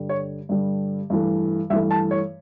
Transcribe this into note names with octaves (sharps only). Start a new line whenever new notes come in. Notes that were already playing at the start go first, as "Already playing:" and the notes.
Already playing: G2 D3 G3
C#5
G2 D3 G3
G2 E3 A3
G2 E3 A3 E5
A5
C#5